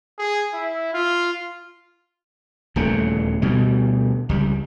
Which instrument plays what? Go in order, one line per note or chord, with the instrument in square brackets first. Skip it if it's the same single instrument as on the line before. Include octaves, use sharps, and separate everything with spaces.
[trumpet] G#4
E4
F4
[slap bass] D#1 E2 C#3 A3
D2 B2 G3
C#2 G3